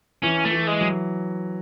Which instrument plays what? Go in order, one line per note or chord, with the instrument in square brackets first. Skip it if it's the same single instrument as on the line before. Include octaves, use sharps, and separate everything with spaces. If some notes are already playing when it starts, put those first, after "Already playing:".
[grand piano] E3 [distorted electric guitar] C#4
[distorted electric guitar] A3
[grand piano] E3
[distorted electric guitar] G#3
[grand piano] F#3